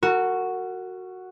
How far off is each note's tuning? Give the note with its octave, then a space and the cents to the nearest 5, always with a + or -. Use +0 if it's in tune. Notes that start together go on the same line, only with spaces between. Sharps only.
F#4 +0 A#4 -35